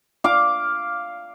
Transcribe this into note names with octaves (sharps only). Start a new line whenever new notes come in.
F5 D6